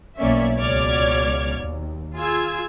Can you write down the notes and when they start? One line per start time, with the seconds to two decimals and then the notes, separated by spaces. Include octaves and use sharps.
0.17 B1 A#3 C#4 C#5 D5 E5
0.57 C#2 B2 C#5 D5 F6 G#6
1.58 D#2
2.17 F4 G#4 E6 G#6